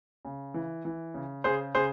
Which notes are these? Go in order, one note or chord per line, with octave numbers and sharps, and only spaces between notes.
C#3
E3
E3
C#3
C#3 G#4 C5
C#3 G#4 C5